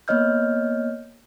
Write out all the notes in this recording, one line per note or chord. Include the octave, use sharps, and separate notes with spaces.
A#3 B3 C#5 D#5 F6 G6